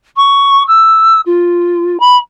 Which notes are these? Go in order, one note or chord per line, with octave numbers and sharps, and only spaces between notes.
C#6
E6
F4
B5